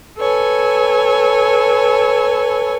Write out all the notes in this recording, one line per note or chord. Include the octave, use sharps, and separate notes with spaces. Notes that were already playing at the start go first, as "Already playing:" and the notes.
A4 B4 C#5 G#5